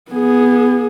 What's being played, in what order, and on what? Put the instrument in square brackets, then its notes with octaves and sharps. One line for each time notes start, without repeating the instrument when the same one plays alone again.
[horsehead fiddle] B3 G#4